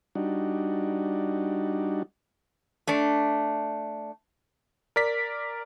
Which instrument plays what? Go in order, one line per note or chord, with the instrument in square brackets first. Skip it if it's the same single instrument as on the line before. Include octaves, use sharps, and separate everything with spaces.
[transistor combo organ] G3 D4 D#4 F#4
[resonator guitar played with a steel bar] A3 D4
[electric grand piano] A#4 D5 B6